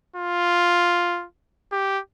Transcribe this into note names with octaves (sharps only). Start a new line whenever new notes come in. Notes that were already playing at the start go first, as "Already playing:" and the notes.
F4
G4